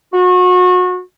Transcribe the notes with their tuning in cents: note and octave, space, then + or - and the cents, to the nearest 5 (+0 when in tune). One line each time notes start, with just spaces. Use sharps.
F#4 -30